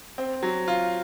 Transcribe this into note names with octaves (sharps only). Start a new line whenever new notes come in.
C4
F#3
F4